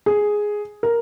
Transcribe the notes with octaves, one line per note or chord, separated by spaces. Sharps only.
G#4
A#4